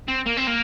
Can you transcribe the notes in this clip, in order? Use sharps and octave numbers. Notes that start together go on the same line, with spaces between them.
C4
A#3
C4
A#3